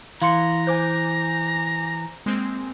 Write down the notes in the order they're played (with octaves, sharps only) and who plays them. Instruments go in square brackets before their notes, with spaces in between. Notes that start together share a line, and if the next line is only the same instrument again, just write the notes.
[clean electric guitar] E3 [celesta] F5 C6 C#7 [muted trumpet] A#5
[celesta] C5 [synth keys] G#5 D6 G6
[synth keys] G#3 A#3 C4